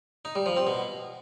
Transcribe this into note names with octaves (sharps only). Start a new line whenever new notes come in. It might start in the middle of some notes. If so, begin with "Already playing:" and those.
D#4
G3
F3
C4
B2